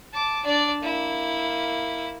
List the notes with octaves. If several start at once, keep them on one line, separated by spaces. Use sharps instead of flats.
A5 D6
D4 D5
A#3 E4